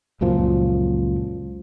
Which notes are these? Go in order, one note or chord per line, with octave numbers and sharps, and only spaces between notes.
C#2 F#2 A#2 F3